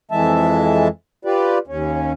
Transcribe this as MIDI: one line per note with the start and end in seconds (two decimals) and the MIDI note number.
0.11 0.88 41
0.11 0.88 52
0.11 0.88 56
0.11 0.88 76
0.11 0.88 81
1.25 1.58 65
1.25 1.58 67
1.25 1.58 71
1.25 1.58 74
1.67 2.13 39
1.67 2.13 61